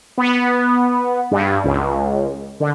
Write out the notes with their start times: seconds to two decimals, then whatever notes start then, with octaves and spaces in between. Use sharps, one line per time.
0.18 B3
1.31 G2
1.64 C#2
2.60 D3